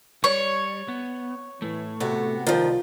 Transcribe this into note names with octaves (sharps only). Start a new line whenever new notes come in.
G3 C#5 D5
B3
A2 E3 A3
C3 B3 F#4 A4
C2 D#3 F3 F4 D5